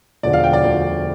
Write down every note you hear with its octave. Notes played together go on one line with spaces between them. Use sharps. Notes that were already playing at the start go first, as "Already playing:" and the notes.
E1 D2 D3 F3 D5
F5
G5
D5
E1 D2 D3 F3